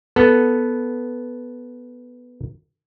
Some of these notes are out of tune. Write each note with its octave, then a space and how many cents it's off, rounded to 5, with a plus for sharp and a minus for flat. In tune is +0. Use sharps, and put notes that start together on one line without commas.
B3 +0 A4 +0